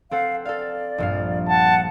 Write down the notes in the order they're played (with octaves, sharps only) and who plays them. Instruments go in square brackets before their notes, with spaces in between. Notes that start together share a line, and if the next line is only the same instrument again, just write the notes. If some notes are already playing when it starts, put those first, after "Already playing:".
[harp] C4 A4 F#5 [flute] F5
[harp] A4 F5 [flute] D5
[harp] A#1 G2 F5
[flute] F#5 [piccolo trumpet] A5